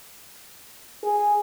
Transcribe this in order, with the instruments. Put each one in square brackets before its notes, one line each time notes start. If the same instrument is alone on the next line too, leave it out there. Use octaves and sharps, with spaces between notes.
[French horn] G#4